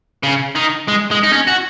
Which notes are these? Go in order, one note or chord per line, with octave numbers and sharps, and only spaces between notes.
C#3
D#3
G#3
G#3
D#4
C#4
F#4